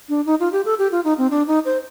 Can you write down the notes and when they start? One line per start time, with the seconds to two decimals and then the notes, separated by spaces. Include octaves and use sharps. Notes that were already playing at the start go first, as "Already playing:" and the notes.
0.09 D4
0.26 D#4
0.40 F4
0.52 G4
0.65 A4
0.79 G4
0.92 F4
1.04 D#4
1.18 C4
1.31 D4
1.47 D#4
1.65 C5